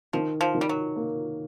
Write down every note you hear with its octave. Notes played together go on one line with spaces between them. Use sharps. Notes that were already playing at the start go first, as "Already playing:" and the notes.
D#3 F3
F3
D#3
G3
F#3
A#3